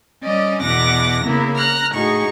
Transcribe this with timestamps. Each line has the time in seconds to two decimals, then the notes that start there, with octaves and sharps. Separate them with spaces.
0.23 G3 C#4 D5 D#5
0.61 E2 B2 F#5 D6 A#6
1.23 C#3 A#3 B3 E4
1.57 A#5 F6 F#6
1.92 A2 D#4 F#4 G#4 C#6